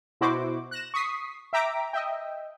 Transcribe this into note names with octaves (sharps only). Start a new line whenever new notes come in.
B2 E4 F#4 C5 D6
F#6 A#6 E7
C#6 D#6 B6 C7
E5 G5 A#5 D6 B6 D7
D#5 E5 G5